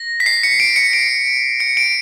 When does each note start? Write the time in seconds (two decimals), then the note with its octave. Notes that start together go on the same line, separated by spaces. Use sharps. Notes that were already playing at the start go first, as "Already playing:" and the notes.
Already playing: A#6
0.20 B6
0.26 C7
0.43 C#7
0.60 D7
0.76 C#7
0.93 D7
1.60 C#7
1.77 D7